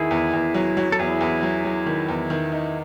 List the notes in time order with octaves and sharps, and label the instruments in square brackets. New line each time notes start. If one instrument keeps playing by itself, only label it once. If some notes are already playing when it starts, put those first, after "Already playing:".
Already playing: [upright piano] E2 D#3 [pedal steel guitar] E4 G#4
[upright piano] E2
E2
F#3
F#3
[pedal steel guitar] A4
[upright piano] E2 [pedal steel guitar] E4 G#4
[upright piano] E2
F#3
F#3
D#3
E2
D#3
D#4